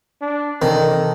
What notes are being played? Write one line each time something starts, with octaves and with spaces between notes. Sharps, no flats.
D4
C3 D#3 E3 C4 A4